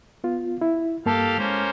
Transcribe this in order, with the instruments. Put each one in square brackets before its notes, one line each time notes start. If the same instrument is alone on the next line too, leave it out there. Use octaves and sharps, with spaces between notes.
[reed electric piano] B3 F4
E4
[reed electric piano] G2 A#3 A5 [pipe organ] G4 A4 F5
[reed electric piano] G#3 [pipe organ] A#3 C#4 C5